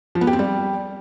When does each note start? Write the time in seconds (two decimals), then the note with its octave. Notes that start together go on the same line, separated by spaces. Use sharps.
0.15 F3
0.21 B3
0.27 G4
0.33 C4
0.39 G3